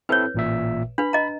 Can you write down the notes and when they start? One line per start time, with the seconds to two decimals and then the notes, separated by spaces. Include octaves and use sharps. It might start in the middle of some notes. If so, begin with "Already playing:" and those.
0.09 C4 E4 A4 B4 C#5
0.34 A1 A#2 E5
0.98 D4 B4 B5
1.13 D#5 A#5